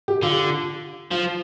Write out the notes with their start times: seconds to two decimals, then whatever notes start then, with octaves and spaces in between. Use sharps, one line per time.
0.08 G4
0.22 D3 F4
1.11 F3 F4